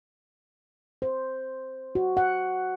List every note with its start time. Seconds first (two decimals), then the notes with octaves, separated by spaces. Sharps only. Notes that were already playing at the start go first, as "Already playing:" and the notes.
1.02 C5
1.95 F#4
2.17 F#5